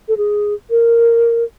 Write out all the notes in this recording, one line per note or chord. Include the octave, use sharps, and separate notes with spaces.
A4
G#4
A#4